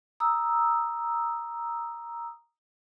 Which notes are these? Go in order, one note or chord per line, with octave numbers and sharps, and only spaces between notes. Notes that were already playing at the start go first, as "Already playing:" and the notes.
A#5 D#6 E6